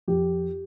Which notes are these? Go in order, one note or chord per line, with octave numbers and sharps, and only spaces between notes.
F2 G4